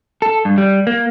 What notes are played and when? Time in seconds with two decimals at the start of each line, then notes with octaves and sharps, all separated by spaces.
0.22 A4
0.45 G2
0.58 G3
0.87 A#3